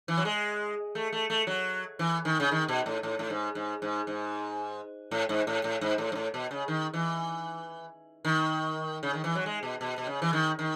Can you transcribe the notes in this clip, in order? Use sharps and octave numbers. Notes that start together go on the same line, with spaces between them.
E3
F#3
G#3
A3
A3
A3
F#3
E3
D#3
C#3
D#3
B2
A2
A2
A2
G#2
G#2
G#2
G#2
A2
G#2
A2
A2
G#2
A2
G#2
A2
B2
C#3
D#3
E3
D#3
C#3
D#3
E3
F#3
G#3
B2
B2
B2
C#3
E3
D#3
D#3